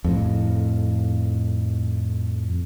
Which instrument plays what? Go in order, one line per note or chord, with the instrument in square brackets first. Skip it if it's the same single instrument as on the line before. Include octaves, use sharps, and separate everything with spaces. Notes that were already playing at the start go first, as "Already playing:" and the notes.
[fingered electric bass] F2 A2